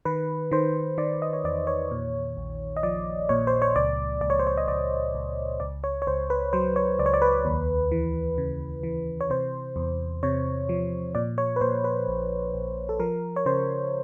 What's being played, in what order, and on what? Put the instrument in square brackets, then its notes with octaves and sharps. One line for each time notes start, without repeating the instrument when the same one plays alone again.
[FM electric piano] D#3 B4
D#3 C5
D#3 D5
D#5
C#5
E2 D5
C#5
A#2
A#1
D#5
F3 D5
A#2 C#5
C5
C#5
C#2 D5
C#2 D5
C#5
C5
C#5
D#5
C#2 D5
C#2
C#2 D5
C#5
C#5
C#2 C5
B4
F#3 C5
C#5
C#2 D5
C#5
D5
B4
D#2
E3
C#3
E3
C#5
C3 C5
E2
C3 C#5
F3
A#2 D5
C#5
B4
A#2 C5
B4
A#1
A#1
A4
F3 A#4
C#5
C#3 C5